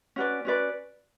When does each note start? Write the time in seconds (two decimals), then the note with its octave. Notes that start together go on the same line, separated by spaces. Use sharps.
0.16 C#4 F#4 B4 D5
0.45 C#4 F#4 B4 D5